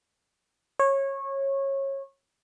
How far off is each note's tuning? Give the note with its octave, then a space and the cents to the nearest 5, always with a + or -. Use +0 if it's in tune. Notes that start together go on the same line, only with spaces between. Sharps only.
C#5 -20